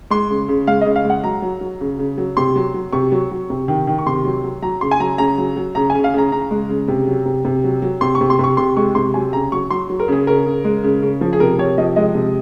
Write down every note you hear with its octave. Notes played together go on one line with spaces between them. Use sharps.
G#3 C6
C#3
C#3
G#3 F5
C#3 D#5
F5
G#3 F#5
F#3 A#5
F#3
F#3
C#3
C#3
F#3
C3 C6
F#3
F#3
C3 C#6
F#3
F#3
C3
D#3
D#3
C#6
C3 C6
F#3
F#3
F#3 A#5
C#3 C6
G#5
F#3 A#5
C#3 A#5
F#3
F#3
C#3 A#5
C#3 G#5
F5
C#3 A#5
C#3 A#5
G#3
C#3
C3
F#3
C3
C3
F#3
F#3
C3 C6
C#6
C3
C6
C3 C#6
C3 C6
G#3 C#6
C3 C6
F#3 G#5
C#3 A#5
F#3 C#6
F#3 C6
F#3
A#4
C#3 G#4
C#3 A#4
C#3
G#3
C#3
C#3
F3
G#4
C3 A#4
C3 C#5
F3 D#5
G#3 D#5
C3